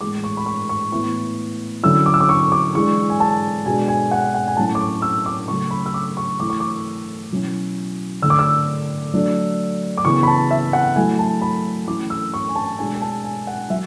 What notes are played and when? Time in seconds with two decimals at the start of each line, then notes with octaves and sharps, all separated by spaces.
0.01 A2 E3 G#3 D6
0.24 C#6
0.37 B5
0.46 C#6
0.69 C#6
0.92 A2 E3 B3 E4 C#6
1.83 D3 F#3 C#4 E4 E6
2.06 D6
2.14 E6
2.20 D6
2.29 C#6
2.52 D6
2.75 E3 G#3 D4 C#6
3.10 G#5
3.20 A5
3.66 B2 G#3 D4 G#5
3.88 G#5
4.11 F#5
4.34 F#5
4.47 G#5
4.57 A2 F#3 A3 C#4 E4 A5
4.75 D6
4.80 C#6
5.02 E6
5.26 D6
5.48 C#3 F#3 A3 C#6
5.71 B5
5.86 E6
5.94 D6
6.17 C#6
6.40 E3 A3 E4 D6
6.50 C#6
6.60 D6
7.31 B2 F#3 C#4 E4
8.22 D3 A3 D4 E6
8.30 D6
8.39 E6
9.14 F#3 A3 D4
9.98 D6
10.05 C#3 E3 B3 C#6
10.23 B5
10.27 A5
10.51 E5
10.73 F#5
10.96 F#3 A3 E4 G#5
11.19 A5
11.41 B5
11.87 E3 A3 C#4 E4 D6
12.10 E6
12.34 C#6
12.49 G#5
12.56 A5
12.79 B2 G#3 D4 G#5
12.95 G#5
13.02 A5
13.24 G#5
13.47 F#5
13.70 F#3 E5